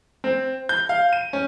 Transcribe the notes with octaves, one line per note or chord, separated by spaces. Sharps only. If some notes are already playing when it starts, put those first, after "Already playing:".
C4
G6
F5
D#7
C#4